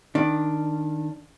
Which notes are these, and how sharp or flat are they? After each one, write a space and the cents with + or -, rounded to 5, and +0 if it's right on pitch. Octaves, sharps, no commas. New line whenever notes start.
D#3 -10 D4 +0